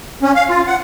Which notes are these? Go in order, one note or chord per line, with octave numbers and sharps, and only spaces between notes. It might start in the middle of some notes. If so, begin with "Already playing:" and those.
C#4
F5
F4
F#5